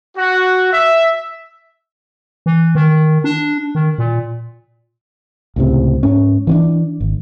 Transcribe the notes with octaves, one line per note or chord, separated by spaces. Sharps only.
F#4
E5
E3
D#3
D4
D#3
A#2
C#2 A2 C3
G#2 C#4
E3 C#4 D4
G#1